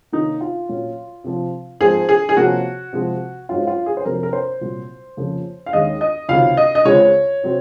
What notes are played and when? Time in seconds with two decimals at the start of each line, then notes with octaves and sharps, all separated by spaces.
0.12 C3 D#3 A#3 C#4 D#4
0.41 F4
0.69 A#2 F#3 C#4
1.24 C3 F3 C4
1.80 G#2 F3 C4 G#4
2.09 G#4
2.29 G#4
2.36 C3 F3 A#3 C#4 F#4
2.93 C3 F3 G#3 C4
3.49 G#2 F#3 C#4 F4
3.67 F4
3.86 G#4
3.97 C5
4.05 F2 C3 F#3 C4 A#4
4.23 A#4
4.33 C5
4.61 C2 A#2 F#3
5.17 F2 C#3 F3 A#3 C#4
5.66 F5
5.73 D#2 D#3 G#3 C#4 D#5
6.01 D#5
6.29 C#2 C3 D#3 F#3 F5
6.57 D#5
6.75 D#5
6.85 C#2 C#3 G#3 C4 C#5
7.43 C3 F#3 C4